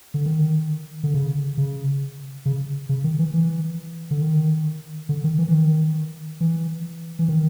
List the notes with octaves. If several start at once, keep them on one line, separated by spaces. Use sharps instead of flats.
D3
D#3
D3
C#3
C#3
C#3
C#3
D#3
E3
E3
D3
D#3
D3
D#3
E3
E3
D#3
E3
E3
D#3